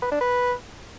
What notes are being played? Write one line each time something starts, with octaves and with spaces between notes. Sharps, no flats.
B4
D4
B4